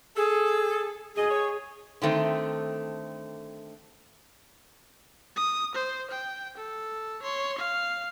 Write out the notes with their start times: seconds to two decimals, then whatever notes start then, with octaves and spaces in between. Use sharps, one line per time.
0.16 G#4 A4
1.16 D2 G#2 G#4 D#5
1.30 C#5
2.02 D3 D#3 A3 C4
5.36 D#6
5.75 C5
6.11 G5
6.57 A4
7.23 C#5 C6
7.58 F5